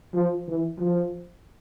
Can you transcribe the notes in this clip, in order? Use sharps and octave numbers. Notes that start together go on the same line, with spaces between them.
F3
E3
F3